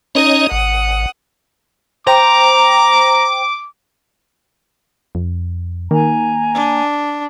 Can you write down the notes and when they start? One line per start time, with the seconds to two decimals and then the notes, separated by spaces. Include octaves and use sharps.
0.15 C#4 D#4 C#5 D#5 D#6
0.51 G#1 F#5 D#6
2.07 C5 G5 A#5 D6
5.15 F2
5.91 D#3 A#3 G#5 A#5
6.54 D4